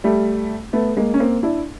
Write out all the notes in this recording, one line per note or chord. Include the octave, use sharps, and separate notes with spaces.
G3 A3
A3 B3
G#3 A#3
C#4
A#3 C4
D4 E4